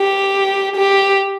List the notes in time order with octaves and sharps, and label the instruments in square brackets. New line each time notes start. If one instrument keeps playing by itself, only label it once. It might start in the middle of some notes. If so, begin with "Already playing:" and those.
Already playing: [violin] G4
G4